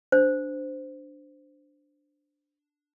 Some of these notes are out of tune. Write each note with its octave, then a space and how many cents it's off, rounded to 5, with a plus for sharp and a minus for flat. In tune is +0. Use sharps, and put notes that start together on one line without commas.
D4 +0 C5 -15